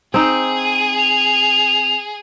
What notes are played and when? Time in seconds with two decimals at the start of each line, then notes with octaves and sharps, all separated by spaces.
0.14 C4 D#4 G#4
0.64 D#7
0.98 F7